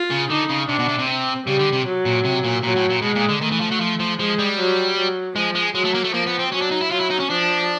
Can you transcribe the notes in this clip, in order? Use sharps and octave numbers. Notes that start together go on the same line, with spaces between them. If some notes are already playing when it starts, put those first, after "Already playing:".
Already playing: F4
C#3
D3 D#4
C#3
C3 D4
B2
C3
C3
C4
C#3 G3
D3
C3
F#3
A#2
C3
A#2
A#2 F#3
A2
A#2
B2 G#3
A#2
D3
D#3 A3
E3
F3
F#3
F3
F3
F3 G#3
G3
F#3
F#3
F3 G#3
G#3
F#3 G#3
A3
A#3
A3
F3 A#3
B3
C4
F#3 C#4
D4
D#4
E4
F#3 F4
E4
D#4
C#4
F3 D4